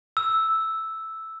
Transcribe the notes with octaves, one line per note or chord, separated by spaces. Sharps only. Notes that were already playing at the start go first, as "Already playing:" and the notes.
E6